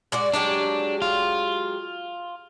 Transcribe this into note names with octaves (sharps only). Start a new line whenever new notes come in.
G#3 F#4 D5
F#3 G#3 D4 G4
F4